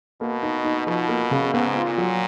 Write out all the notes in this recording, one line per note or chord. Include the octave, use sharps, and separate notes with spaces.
B2 A#3
D#4
D#4
B2 F3
A#3
C#3
G#2 B3
F4
A#2
F#3